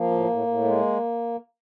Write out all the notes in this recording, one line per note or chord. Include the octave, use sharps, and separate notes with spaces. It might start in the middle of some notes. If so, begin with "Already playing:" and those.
Already playing: F3 A#3
A2
A2
A2
G#3